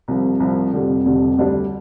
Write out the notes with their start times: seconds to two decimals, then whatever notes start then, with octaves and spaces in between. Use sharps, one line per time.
0.08 C2 C3 F3
0.40 C2 C3 F3
0.73 F1 F2 D3 G3
1.05 F1 F2 D3 G3
1.37 D2 D3 G3 D4